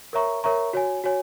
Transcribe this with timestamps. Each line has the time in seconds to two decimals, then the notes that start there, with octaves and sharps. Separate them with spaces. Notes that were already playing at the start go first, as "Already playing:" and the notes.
0.13 A#4 C#5 E5 A#5 C#6
0.44 A#4 C#5 E5 A#5 C#6
0.73 F#4 C#5 G#5
1.04 F#4 C#5 G#5